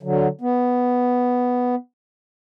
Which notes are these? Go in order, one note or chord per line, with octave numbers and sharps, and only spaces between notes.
D3 F#3
B3